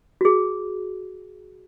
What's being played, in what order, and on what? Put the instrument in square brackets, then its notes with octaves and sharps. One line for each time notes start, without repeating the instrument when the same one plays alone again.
[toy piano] F#4 G#4